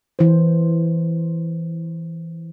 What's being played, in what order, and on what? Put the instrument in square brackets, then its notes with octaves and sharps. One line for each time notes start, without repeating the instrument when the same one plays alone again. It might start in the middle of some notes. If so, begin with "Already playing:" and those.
[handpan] E3 C5